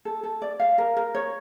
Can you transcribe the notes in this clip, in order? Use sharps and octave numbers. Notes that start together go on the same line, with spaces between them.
A4
A4
D5
F5
A#4
A#4
C#5